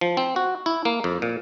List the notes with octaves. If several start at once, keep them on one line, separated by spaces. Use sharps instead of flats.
F3
C4
F#4
E4
A#3
F2
A#2